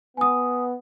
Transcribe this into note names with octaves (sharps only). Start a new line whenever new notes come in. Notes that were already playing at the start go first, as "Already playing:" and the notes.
B3 G#5 D#6